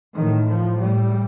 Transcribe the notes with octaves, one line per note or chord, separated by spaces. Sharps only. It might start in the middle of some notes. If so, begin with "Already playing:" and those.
A2 D#3
F3
A2 G3